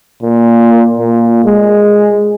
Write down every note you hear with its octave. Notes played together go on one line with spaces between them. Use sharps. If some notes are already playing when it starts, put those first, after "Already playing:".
A#2
A#2
G#3